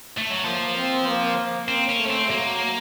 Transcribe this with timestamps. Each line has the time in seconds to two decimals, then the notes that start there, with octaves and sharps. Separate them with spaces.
0.18 A3
0.30 F#3
0.45 F3 A#3
0.76 C4
1.07 A#3
1.68 C4
1.89 C#4
2.00 A3
2.10 C4
2.31 F#3 A#3